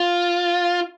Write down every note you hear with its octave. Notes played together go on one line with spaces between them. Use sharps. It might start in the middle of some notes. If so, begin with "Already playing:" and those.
Already playing: F4